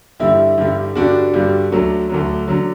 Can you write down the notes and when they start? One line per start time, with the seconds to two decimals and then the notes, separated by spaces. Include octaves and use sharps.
0.20 G2 D3 G3 E4
0.58 G2 D3 G3
0.95 G2 D3 G3 D4 F#4
1.33 G2 D3 G3
1.72 D2 D3 F#3
2.09 D2 D3 F#3
2.48 D3 F#3